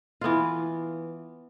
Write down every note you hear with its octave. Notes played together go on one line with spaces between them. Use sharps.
E3 B3 F4